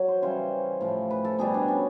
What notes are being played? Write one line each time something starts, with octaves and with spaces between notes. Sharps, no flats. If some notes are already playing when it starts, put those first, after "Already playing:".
Already playing: F#3
C5
C#3 E3 G3 C5
A2 F3
B4
A4
B2 G3 G#4
D4
C#4